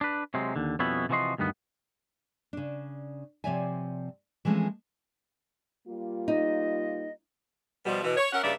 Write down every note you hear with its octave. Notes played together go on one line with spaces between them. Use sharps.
D4 B4
C3 F#3 G#3 C4
D#2 D3
F2 B2 G3 B3 C#4 E4
C3 E3 F3 F#4 D#5 C6
D2 G2 D#3 B3
C#3 D4
C3 F3 C#5 D5 E5 G#5
E3 F3 G#3 A3 C4 C#4
G3 A#3 F4
D#4 D#5
B2 F3 G3
B2 E3
C#5
C#4 A#4 E5 F#5
G2 C#3 A3 A#3 D5 E5